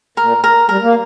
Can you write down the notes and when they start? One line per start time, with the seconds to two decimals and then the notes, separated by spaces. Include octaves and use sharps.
0.17 A#2 A#4
0.44 A#4
0.69 G3 A#4
0.83 A#3